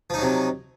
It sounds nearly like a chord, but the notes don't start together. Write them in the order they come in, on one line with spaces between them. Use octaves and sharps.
F3 D#4 F#3 C3